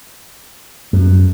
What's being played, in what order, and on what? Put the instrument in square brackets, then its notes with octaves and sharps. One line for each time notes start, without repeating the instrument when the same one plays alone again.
[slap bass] F#2